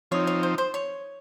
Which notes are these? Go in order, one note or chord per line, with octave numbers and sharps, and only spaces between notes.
F3 C4 D#4 C#5
C#5
C5
C5
C#5